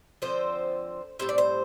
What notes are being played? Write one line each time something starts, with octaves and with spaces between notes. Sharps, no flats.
D3 F3 C4 C5
A2 G3 C4 C5
D5
C5